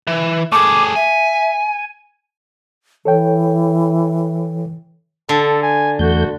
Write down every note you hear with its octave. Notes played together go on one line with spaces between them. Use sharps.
E3
A3 G#4 D6
E5 G#5
E3 A4 C#5 G5
D3 A4
G#5
E2 A3 F#4 G6